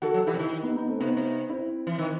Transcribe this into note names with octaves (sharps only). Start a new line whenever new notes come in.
D#3 F#4 A4
F#3
E3 E4 G4
C3
D#3
B3 D#4
B3 D#4
A3 C4
C3 B3 D#4
C3
C4 E4
E3
D#3